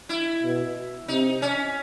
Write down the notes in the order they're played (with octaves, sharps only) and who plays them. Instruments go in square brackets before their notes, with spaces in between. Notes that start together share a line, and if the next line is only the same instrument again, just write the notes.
[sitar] E4
[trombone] B2
[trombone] C3 [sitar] D#4
[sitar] C#4